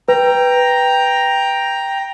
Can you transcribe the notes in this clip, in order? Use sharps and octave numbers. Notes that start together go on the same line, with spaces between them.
B4 G5 A#5